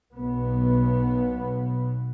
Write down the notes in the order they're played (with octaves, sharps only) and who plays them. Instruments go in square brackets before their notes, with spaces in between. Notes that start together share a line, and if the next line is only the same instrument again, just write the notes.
[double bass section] B1 B2 B3